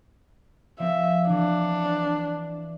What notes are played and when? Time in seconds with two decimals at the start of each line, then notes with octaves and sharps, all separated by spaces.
0.79 F3 C4 E5
1.29 E3 D4